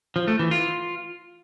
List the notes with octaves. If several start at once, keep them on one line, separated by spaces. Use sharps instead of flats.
F3
A3
E3
F4